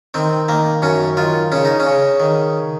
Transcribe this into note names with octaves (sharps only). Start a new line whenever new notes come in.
D#3 C4
D#3 A#3
F#2 C#4
D#3 F4
C#3 C#4
D#4
C#4
C#3
D#3